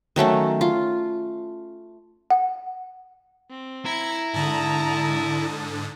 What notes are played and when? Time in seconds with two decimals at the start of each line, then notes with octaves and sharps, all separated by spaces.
0.16 D#3 F#3 A3 C#4
0.61 F4
2.30 F#5
3.50 C4
3.85 E4 A#5 G#6 C#7
4.34 G#2 D3 A5 D#6